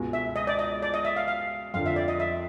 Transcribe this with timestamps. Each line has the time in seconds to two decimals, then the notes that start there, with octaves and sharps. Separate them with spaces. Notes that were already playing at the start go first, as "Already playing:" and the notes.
Already playing: C#2 B2 G#3
0.13 E5
0.36 D#5
0.47 D5
0.59 D#5
0.82 D5
0.94 D#5
1.05 E5
1.16 F5
1.28 F5
1.74 F2 D3 F3 F5
1.86 E5
1.96 D5
2.08 D#5
2.20 E5